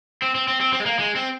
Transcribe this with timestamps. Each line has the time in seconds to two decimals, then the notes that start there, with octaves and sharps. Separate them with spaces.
0.22 C4
0.35 C4
0.48 C4
0.61 C4
0.73 C4
0.80 G#3
0.86 A#3
0.99 G#3
1.15 C4